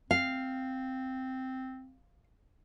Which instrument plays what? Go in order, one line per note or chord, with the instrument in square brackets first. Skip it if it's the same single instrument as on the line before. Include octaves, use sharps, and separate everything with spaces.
[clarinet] C4 [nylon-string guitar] F5